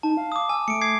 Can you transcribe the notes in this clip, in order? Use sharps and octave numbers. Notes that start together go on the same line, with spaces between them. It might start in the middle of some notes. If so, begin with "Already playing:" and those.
D#4 A5
F5
D6 D#6
G#5 E6
A3 C#7 D7
D6 G#6 C7